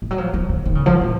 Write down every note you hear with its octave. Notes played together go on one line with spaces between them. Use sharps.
F3
F#3
F3
F3
D#3
D#3
C#3
F3
A#2